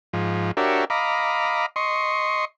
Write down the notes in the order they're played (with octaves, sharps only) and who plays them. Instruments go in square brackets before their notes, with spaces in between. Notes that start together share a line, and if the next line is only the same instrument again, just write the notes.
[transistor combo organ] G#2 F3
D4 F#4 G4 A#4 C#5 E5
D#5 F5 A#5 B5 D6
D#5 C6 C#6